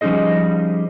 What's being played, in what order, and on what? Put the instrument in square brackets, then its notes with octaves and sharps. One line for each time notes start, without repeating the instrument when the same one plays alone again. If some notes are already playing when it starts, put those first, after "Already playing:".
[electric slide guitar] F3 G3 C#4 D#4 G#4 D#5